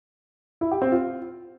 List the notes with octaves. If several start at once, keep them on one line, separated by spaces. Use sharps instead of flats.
E4
G4
C4
F4